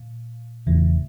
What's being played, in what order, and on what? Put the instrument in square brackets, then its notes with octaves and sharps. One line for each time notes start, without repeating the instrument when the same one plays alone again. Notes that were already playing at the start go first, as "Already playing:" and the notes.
Already playing: [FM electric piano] A#2
[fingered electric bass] E1 E2 C#3 E3 [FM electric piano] A2